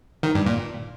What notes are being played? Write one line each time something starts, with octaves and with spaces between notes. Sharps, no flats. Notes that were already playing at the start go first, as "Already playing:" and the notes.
D#3
G2
A#2